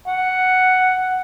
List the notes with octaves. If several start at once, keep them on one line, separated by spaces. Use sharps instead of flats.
F#5